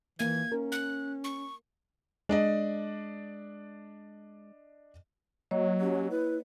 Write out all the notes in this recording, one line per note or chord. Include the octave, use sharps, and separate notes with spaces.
E3 A#3 E5 G#6
C#4 A#4
F#6
C#6
G#3 D4 D5 D#5
F#3 A#3 C#5 D#5
C#4 G4
E4 B4